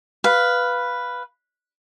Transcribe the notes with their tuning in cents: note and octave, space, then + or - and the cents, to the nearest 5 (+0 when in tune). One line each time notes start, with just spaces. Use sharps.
B4 +0 F5 +0